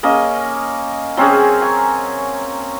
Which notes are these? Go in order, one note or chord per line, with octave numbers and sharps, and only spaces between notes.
A#3 C#4 D#5
F#3 C4 C#4 G#4
G#5